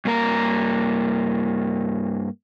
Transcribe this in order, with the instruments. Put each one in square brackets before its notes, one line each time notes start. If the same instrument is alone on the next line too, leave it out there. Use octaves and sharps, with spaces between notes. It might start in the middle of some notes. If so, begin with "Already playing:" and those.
[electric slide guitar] G2 A#3 A#4 A#5